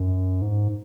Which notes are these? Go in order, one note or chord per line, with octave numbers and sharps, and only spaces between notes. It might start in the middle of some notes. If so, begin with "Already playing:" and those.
Already playing: F#2
G#2